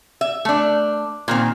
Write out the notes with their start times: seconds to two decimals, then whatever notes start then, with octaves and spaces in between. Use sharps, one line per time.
0.21 E5
0.45 A3 D4
1.28 A#2 D#3 C4